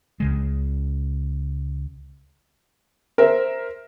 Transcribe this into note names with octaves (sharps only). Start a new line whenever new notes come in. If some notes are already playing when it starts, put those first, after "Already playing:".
C#2 C#3 G#3
A#4 C5 E5